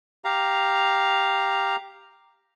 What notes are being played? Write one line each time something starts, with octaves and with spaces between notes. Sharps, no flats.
G4 F5 A#5